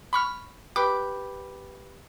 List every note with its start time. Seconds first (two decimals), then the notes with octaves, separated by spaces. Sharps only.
0.13 B5 C#6 F6
0.76 G4 B4 D6